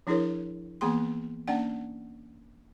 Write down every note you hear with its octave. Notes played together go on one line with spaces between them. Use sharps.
F3 D4 E4 G#4 A#4 C#5
E3 A#3 B3 G#4 G5 C6
A#3 C#4 D4 D5 F#5 G5